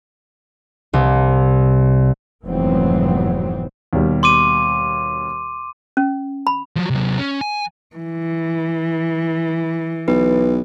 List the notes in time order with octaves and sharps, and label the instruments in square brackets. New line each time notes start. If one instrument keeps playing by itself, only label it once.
[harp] C2
[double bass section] F1 G#2 E3 F#3 B3 C4
[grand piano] D#2 B2 G3
[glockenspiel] C6 D6 D#7
[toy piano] C#4
B5
[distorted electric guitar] F3 F#3
C3 F#3
C#4
G#5
[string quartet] E3
[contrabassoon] B1 [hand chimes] B4